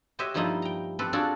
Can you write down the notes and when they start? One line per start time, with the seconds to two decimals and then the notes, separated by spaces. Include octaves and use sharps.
0.19 F#4 G4 C5 C#5 D#5 E5
0.34 G2 F3 G3 A#3 D#4 E4
0.62 G5 A#5
0.99 C4 G4 A4 B4
1.13 C4 D4 F4 F#4 G#4 A4